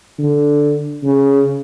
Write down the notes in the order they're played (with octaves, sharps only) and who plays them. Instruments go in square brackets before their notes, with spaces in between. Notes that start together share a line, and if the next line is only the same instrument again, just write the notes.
[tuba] D3
C#3